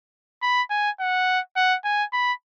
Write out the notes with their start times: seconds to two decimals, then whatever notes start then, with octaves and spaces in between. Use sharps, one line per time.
0.42 B5
0.70 G#5
1.00 F#5
1.56 F#5
1.84 G#5
2.13 B5